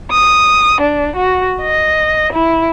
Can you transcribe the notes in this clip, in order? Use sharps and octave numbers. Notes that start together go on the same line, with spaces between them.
D#6
D4
F#4
D#5
E4